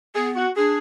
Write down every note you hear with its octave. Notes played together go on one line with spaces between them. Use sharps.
B3 G#4
F#4
D4 G#4